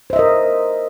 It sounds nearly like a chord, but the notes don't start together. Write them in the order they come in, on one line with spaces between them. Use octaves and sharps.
C5 E5 D#5 A#4